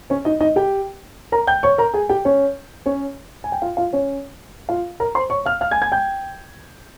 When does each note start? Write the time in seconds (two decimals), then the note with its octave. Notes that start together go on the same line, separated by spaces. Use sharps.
0.10 C#4 C#5
0.25 D#4 D#5
0.40 D#4 D#5
0.56 G4 G5
1.32 A#4 A#5
1.47 G5 G6
1.63 C#5 C#6
1.78 A#4 A#5
1.94 G#4 G#5
2.09 G4 G5
2.25 C#4 C#5
2.86 C#4 C#5
3.44 G#5
3.52 G5
3.62 F4 F5
3.77 F4 F5
3.93 C#4 C#5
4.69 F4 F5
5.00 A#4 A#5
5.15 C5 C6
5.30 C#5 C#6
5.46 F5 F6
5.61 F5 F6
5.71 G#5 G#6
5.82 G#5 G#6
5.92 G5 G6